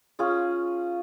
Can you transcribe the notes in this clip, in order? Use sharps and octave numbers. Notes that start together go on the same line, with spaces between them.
C#4 F4 G#4